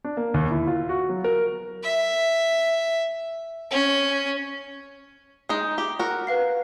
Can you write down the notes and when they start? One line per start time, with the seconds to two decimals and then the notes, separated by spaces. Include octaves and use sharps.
0.04 D4
0.17 A#3
0.34 D#2
0.51 E4
0.67 F4
0.89 F#4
1.09 F#3
1.24 A#4
1.83 E5
3.70 C#4
5.49 G#3 D#4
5.78 G4
5.99 F#4 A#4
6.27 B4 F5 C7